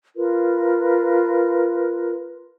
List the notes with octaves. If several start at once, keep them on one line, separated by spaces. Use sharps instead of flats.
F4 A#4 B4